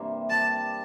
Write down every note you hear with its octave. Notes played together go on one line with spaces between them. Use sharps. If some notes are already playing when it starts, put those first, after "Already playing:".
Already playing: G2 C3 E3 A#3 D4
G3 D4 G4 A5